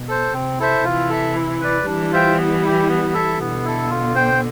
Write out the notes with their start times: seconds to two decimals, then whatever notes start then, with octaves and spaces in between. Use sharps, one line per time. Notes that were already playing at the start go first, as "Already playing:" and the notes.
Already playing: B2
0.08 A4 C5
0.33 C3 C4
0.59 E4 A4 C5 E5
0.84 C3 E3 F4
1.09 A4 E5
1.36 E4
1.61 B4 D5
1.86 E3 G3 D4
2.12 F4 C5 E5 G5
2.38 B3
2.62 E4 G4
2.88 B3
3.13 E4 A4 E5
3.38 B2 D3 B3
3.65 E4 A4
3.90 F4
4.15 C5 G5